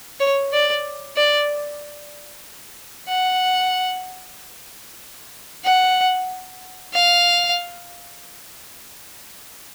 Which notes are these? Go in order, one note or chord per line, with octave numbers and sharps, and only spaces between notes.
C#5
D5
D5
F#5
F#5
F5